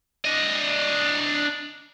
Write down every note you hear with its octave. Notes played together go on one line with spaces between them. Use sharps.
D4 D#5